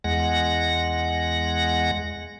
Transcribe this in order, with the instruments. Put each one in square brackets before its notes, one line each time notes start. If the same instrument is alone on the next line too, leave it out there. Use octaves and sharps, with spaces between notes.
[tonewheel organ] E2 G#3 F#5 A#6